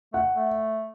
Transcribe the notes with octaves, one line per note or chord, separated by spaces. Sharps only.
A3 F#5
A3